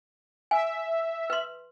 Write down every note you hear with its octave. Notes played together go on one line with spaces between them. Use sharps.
E5 G#5
B4 C6